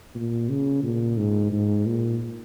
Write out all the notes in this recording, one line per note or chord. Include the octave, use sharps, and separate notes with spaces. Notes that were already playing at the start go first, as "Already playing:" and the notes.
A#2
C#3
A#2
G#2
G#2
A#2